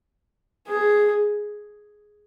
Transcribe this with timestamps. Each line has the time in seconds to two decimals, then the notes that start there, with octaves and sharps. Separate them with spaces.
0.68 G#4